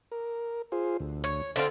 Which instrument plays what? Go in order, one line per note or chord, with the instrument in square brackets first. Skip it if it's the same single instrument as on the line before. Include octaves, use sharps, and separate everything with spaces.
[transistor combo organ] A#4
F4 G#4 C5
D2
[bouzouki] C#5
D3 C4 F4